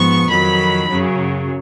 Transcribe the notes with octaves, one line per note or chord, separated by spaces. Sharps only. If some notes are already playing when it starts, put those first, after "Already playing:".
Already playing: G#2 F3 B3 C#6
F2 D#3 F#3 B5
F#2 C#3 F#3